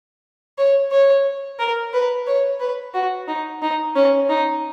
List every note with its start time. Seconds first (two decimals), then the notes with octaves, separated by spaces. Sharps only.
0.58 C#5
0.92 C#5
1.59 A#4
1.93 B4
2.27 C#5
2.60 B4
2.94 F#4
3.28 D#4
3.62 D#4
3.96 C#4
4.29 D#4